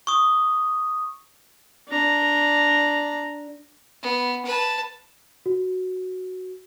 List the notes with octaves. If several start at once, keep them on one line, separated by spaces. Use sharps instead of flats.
C#6 D#6
D4 A#5
B3
B4 A5
F#4